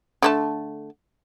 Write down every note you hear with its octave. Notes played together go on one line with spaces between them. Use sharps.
D3 A3 A5